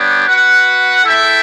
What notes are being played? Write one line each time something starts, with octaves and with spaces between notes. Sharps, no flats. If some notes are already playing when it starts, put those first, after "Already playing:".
Already playing: G3 B3 D4 G4 C#5
F#4 B4 F#5
E4 A4 E5 G5